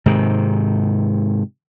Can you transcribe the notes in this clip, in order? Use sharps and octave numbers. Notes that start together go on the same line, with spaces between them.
G#2 C3 D#3